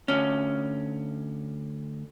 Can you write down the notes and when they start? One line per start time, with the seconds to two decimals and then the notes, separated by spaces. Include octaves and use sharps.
0.08 D2 C#4